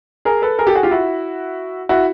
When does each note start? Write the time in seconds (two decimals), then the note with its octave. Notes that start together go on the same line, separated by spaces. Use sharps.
0.25 G#4 A#4
0.42 A4 B4
0.59 G#4 A#4
0.67 G4 A4
0.75 F#4 G#4
0.83 F4 G4
0.91 E4 F#4
1.89 E4 F#4